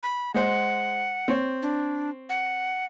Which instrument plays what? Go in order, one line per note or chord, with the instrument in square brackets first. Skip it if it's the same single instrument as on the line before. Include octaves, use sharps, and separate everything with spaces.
[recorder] B5
[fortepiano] G#3 C5 [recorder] F#5
[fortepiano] C4 C#5
[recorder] D4
F#5